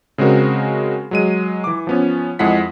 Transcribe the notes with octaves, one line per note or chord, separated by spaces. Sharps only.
C#3 G#3 C4 F#4 A#4
F#3 G#3 D#7
E3 D6
F3 B3 C#4
F2 G#3 E4 G#4 F#5 B6